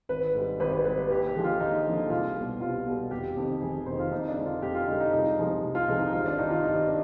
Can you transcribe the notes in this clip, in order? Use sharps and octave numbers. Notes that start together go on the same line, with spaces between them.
G#1 B4
G#2 G3
G#1 B4
B4
G#2 G3 B4
B4
D#2 G4
G4
D3 F3 G#3
F4
D#2 D#4
D3 F3 G#3
C2 F4
B2 G3
C2 F4
B2 G3
F1 G4
F2 C3 D#3
F1 G#4
F2 C3 D#3 C5
F4
F2 D#4
D4
D3 G#3
F4
F2 G4
F4
D3 G#3 D#4
D#4
C2 D#4
C3 F3 G#3
C2
F4
C3 F3 G#3 D#4
D#4
G#1 F4
D4
G2 D#3 G3 D#4
F4
G#1 D#4
D4